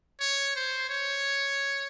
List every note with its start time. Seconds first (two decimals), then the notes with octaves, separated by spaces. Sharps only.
0.20 C#5
0.55 C5
0.89 C#5